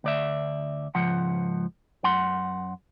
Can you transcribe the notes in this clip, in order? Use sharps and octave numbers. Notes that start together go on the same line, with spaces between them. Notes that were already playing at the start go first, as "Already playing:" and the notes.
D2 D5 E5
C#2 G#2 F3 F#5
F#2 F#5 C6